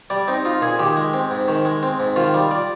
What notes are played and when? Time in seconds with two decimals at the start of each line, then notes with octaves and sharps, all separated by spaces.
0.10 G3 D5
0.28 C4 D#4
0.45 D#4 F4
0.61 A#2 G#4
0.79 D#3 G4
0.97 G#3
1.13 C4
1.31 G#2
1.48 D#3
1.65 G#3
1.83 C4
2.00 G#2
2.16 D#3 F4
2.34 G3
2.51 D5